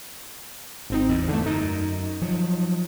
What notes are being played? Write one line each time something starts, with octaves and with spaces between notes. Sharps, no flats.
G#1 C4 D#4
E2 G#2
D3 A3
F#2 D#4
F3 F#3